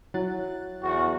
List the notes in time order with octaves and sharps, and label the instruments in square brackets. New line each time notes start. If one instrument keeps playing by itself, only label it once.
[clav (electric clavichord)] F#3 [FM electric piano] E4 F#6 A6
[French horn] E2 [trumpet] F#4